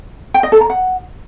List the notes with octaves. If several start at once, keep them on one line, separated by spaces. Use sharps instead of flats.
G5
D#5
A4
A#5
F#5